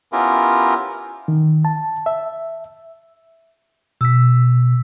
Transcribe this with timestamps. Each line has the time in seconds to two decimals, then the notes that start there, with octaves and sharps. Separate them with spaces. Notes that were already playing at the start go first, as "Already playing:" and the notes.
0.12 B3 C#4 E4 F4 G4 A#4
1.28 D#3
1.65 A5
2.06 E5
4.01 B2 E6 B6